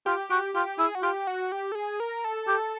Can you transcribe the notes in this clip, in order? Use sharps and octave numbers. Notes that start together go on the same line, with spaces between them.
F4 G4
F#4 G4
F4 G4
E4 G#4
F#4
F4 G4
F#4
G4
A4
G#4
A#4
A4
G4